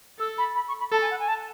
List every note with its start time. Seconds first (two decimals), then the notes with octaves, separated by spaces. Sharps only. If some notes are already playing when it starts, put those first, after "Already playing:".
0.19 A4 E6
0.38 B5
0.55 B5
0.67 C#6
0.79 B5
0.92 A4 A5
1.01 G#5
1.10 F#5
1.19 G#5
1.28 A5